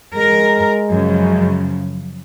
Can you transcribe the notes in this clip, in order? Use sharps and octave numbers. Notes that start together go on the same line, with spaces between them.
G#3 A#4
F#2 C#3 F3